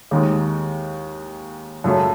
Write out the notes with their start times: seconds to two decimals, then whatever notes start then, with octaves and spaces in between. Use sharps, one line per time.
0.11 D#2 D#3 G#3
1.84 F#2 C#3 F#3 A3